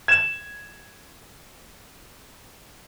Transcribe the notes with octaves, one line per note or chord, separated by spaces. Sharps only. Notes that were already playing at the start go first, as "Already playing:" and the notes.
G#6 E7